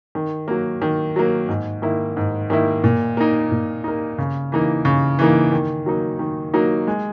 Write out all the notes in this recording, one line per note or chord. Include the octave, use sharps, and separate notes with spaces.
D#3
F#3 A#3
D#3
F#3 A#3
G#2
D#3 A#3 E4
G#2
D#3 A#3 E4
A#2
A#3 D#4
A#2
A#3 D#4
C#3
E3 A#3 D#4
C#3
E3 A#3 D#4
D#3
F#3 A#3 D#4
D#3
F#3 A#3 D#4
G#3